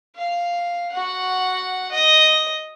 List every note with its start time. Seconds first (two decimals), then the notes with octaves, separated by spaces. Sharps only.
0.16 F5
0.92 F#4 F#5
1.91 D#5